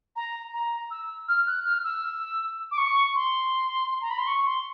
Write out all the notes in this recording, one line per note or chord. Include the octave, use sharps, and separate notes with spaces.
A#5
A#5
E6
F6
F#6
F6
E6
D6
C#6
C6
A#5
B5
C6
C#6
C6